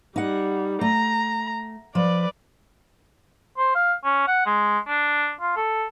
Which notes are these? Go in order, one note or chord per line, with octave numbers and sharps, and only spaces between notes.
G3 D#4 F#5
A3 A#5
F3 B4 D5
C5
F5
C#4
F#5
G#3
D4
F4
A4